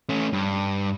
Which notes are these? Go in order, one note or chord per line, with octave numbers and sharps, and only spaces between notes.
A3 C#4
G2